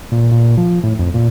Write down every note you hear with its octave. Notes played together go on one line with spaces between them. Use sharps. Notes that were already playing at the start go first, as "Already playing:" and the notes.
A#2
A#2
F3
A2
F2
A#2